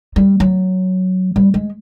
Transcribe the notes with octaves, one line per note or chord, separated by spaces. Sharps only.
G3
F#3
G3
G#3